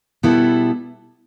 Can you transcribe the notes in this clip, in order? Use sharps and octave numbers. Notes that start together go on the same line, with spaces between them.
B2 G3 B3 E4 A4